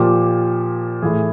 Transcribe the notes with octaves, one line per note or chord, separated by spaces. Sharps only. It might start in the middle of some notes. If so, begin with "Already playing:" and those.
Already playing: A#2 F3 G4
A2 E3 G#4